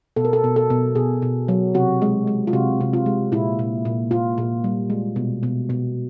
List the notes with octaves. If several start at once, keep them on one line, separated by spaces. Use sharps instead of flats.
B2 A4
A#4
A4
B2
A4
B2
B2 G#4
B2
F#3
C3 F#4
G#3
G#3
F4
C3 F#4
C3
F4
G#3
A#2 E4
A#2
A#2
A#2 F4
A#2
G3
G#3
B2
B2
B2